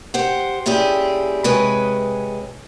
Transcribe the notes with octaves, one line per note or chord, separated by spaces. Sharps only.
G4 C5 F#5
A#2 C#4 E4 G4 G#4
C3 G#3 B4 C#5 D#5 G#5